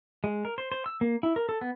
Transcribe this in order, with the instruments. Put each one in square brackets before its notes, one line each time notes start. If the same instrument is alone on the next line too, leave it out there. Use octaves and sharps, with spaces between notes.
[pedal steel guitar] G#3
A#4
C5
C5
E6
A#3
E4
A#4
A4
B3